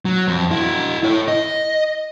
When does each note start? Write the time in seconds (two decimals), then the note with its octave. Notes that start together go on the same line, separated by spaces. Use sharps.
0.05 F#3
0.28 F2
0.51 E4 F#4
1.04 E4 C#5
1.28 D#5